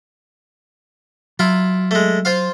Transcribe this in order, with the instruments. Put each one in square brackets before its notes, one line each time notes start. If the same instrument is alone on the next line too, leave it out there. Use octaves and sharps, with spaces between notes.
[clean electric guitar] F#3 [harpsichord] E4 F4
[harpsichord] G#3 A3
F4 C5 F5